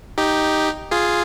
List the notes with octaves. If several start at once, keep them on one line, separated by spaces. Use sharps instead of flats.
D#4 G4
F4 G#4